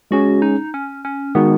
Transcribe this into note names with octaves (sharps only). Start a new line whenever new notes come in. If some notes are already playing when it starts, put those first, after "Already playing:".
G#3 C#4 F#4 G#4
D#4
C#4
C#4
D#3 G#3 B3 D#4 F#4